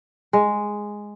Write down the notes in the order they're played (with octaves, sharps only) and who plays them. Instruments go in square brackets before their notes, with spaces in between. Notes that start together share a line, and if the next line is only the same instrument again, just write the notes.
[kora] G#3